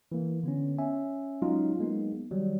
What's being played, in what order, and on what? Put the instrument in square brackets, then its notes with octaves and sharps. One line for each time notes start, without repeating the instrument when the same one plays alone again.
[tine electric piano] E3 A#3
D3 B3 C#4
C#4 E5 G#5
F#3 G#3 C#4 D#4 F4
F#3 G#3 A#3 B3 D#4
D#3 F#3 G3